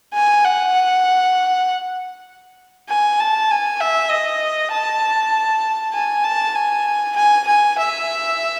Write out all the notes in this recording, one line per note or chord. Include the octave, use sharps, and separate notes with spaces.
G#5
F#5
G#5
A5
G#5
E5
D#5
A5
G#5
A5
G#5
G#5
G#5
E5